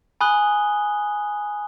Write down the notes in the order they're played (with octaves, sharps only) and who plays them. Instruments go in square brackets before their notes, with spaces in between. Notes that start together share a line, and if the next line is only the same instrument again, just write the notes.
[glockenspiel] G#5 B5 D#6 F#6 G7